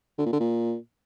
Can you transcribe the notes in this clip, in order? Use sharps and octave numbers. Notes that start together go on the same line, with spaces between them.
D3
A#2
D3
A#2